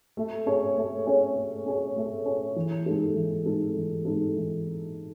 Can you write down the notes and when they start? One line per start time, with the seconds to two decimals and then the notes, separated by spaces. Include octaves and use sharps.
0.17 A3
0.46 C#4 G#4 C#5
0.77 A3
1.06 C#4 G#4 C#5
1.36 A3
1.66 C#4 G#4 C#5
1.96 A3
2.26 C#4 G#4 C#5
2.56 E3
2.86 G#3 D#4 A4
3.15 E3
3.46 G#3 D#4 A4
3.75 E3
4.05 G#3 D#4 A4
4.36 E3